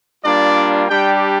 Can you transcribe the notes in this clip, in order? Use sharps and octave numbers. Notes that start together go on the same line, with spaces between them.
G3 A#3 D4 F4 D5
G3 D4 G4 G5